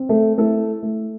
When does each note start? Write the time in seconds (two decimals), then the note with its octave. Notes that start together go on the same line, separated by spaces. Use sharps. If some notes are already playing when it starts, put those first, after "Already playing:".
Already playing: C4
0.09 A3 A4
0.38 A3 E4 A4
0.82 A3